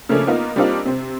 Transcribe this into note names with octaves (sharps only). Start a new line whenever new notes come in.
C#3 F3 A3 A#3 C#4 D4
A#3 B3 D#4 F4
G3 A#3 C4 D4 D#4 F4
C3 C4